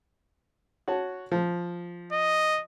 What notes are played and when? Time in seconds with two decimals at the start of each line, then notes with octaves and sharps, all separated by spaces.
0.88 F#4 C#5 A5
1.32 F3
2.12 D#5